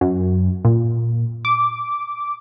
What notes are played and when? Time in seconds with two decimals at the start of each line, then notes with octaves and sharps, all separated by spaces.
0.01 F#2
0.65 A#2
1.45 D6